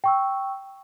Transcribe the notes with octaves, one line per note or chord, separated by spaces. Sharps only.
G5 C#6 E6